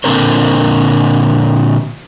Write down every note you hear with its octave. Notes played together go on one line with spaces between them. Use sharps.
A#2 D3 C4 A#4 C5